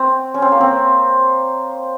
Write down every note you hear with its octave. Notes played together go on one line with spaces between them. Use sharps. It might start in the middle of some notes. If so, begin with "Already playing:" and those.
Already playing: C4
C#4
C4
A#3
C4